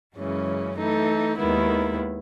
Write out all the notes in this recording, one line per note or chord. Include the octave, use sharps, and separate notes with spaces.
F#2 C#3 E3 G#3 C#4
E3 A3 D#4 A4
D#2 D#3 G#3 B3 E4